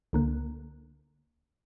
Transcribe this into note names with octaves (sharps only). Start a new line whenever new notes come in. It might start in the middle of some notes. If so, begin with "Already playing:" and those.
C#2 D3 A#3